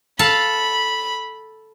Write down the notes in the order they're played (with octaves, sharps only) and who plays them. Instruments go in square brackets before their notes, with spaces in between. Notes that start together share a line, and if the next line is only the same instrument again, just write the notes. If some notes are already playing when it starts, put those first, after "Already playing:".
[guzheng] A4 F5 A5 [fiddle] B5